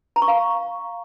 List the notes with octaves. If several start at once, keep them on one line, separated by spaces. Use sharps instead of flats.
A#5
C#6
F5